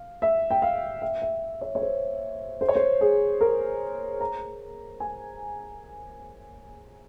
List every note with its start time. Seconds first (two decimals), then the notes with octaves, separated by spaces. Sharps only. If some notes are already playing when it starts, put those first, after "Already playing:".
Already playing: F5
0.22 E5
0.51 G5
0.62 F5
1.02 E5
1.22 E5
1.61 C#5
1.75 C#5
1.82 C5
2.61 C5
2.69 C#5
2.75 C5
3.01 G#4
3.41 A#4
4.21 A#5
5.00 G#5